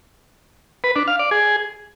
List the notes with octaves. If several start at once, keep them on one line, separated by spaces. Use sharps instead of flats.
B4
D4
F5
D5
G#4